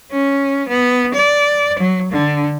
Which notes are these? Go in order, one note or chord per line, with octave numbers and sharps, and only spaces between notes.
C#4
B3
D5
F#3
D3